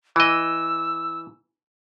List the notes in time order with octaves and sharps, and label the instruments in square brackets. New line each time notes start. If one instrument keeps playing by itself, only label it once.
[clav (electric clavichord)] E3 D#5 [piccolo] E6